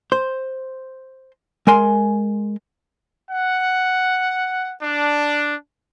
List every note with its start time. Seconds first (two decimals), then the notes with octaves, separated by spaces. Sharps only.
0.12 C5
1.67 G#3 A#4 G#5 C6
3.31 F#5
4.83 D4